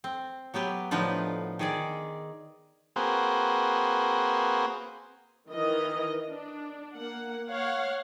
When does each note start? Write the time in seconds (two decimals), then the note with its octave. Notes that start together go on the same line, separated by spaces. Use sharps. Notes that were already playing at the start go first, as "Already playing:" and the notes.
0.04 C4
0.54 F#3 B3 G4 B4
0.91 A2 D3 F3 D#4 F4 B4
1.59 D#3 G#4 D5
2.96 A#3 C4 F#4 G#4 B4 C5
5.48 D#3 E3 D#5
6.29 D4
6.95 A#3 F#5
7.48 C#5 F5 F#5